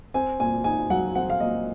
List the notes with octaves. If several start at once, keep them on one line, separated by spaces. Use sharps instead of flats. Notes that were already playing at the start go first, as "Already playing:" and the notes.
C4 G#5
A#2 G#5
D#4 G#5
F#3 F#5
C4 F#5
F5
A#2 D#5